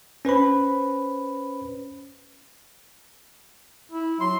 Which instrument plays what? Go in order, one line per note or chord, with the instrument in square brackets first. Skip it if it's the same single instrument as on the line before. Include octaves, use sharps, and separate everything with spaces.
[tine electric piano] C#4 B4 C5 B5
[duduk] E4
[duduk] F#3 [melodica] C6